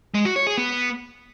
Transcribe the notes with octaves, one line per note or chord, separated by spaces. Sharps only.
G#3
F#4
C#5
G#4
B3